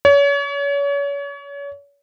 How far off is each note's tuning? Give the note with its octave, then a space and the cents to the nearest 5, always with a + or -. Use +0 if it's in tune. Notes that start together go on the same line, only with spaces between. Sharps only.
C#5 +35